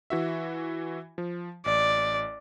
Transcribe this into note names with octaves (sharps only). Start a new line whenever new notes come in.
E3 F#4 E5
F3
A1 D5